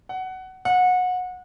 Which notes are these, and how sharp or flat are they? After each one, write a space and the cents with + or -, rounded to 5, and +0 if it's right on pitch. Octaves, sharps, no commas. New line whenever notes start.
F#5 +15
F#5 -25